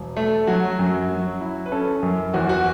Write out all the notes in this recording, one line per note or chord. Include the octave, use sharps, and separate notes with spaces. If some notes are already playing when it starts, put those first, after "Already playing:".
Already playing: E1
A3
F#3 F#4
F#2
F#3
E4
B4
C#4 A4
F#2
E2 F#4
F#4